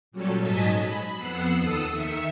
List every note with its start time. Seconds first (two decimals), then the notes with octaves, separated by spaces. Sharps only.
0.12 A#2 F#3 G3 C#4 A4
0.40 G#2 F#3 D#5 G#5 A5 B6
0.81 B5
1.16 F2 B3 F#5 E6 C7
1.55 D#2 A4 D#6 E6
1.89 D#3 E5 C#7